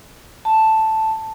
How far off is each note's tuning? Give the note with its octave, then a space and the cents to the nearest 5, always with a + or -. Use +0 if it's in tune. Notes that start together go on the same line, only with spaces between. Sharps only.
A5 +0